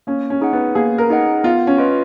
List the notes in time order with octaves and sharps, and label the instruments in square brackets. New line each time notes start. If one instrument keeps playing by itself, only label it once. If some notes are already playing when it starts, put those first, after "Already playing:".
[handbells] A#3 [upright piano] C#4
[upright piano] C#4
[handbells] D#4 G#4 D#5 F#5
[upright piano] B3
[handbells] A#3 [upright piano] G#4
[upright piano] A#4
[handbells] D#4 G#4 D#5 F#5
[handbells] B3 [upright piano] F4
[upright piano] C#4
[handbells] F4 B4 D#5